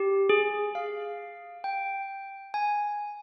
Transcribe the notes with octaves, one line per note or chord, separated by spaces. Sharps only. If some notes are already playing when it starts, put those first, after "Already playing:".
Already playing: G4
G#4
F5
G5
G#5